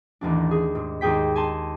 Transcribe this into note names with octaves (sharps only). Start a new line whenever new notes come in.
A1 D#2 D4
G#4
G#2
D#2 G#2 G#4 G5 B6
G#5 A5 C6